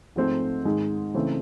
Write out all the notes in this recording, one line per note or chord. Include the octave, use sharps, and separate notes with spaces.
G#2 F3 A3 C4
G#2 D#3 G#3
C#3 E3 A3 C4